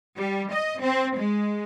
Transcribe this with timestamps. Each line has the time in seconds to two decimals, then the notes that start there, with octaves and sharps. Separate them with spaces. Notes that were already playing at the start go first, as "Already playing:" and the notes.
0.18 G3
0.53 D#5
0.82 C4
1.17 G#3